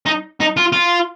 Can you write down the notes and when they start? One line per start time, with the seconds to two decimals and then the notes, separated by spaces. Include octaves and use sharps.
0.06 D#4
0.40 D#4
0.57 F4
0.72 F4